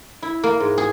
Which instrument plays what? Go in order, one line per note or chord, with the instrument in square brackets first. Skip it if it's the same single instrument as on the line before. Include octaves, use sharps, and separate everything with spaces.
[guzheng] E4
A#3
G#2
G#4